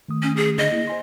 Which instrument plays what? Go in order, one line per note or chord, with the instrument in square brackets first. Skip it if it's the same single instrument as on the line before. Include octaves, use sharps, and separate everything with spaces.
[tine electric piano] D#3 A3 D#6
[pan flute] C#4
G#4
[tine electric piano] D3 D4 G#4 [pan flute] D#5
[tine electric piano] A#3 E4
C5 G#5 C6